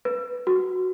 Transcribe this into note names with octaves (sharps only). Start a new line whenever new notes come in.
B4
F#4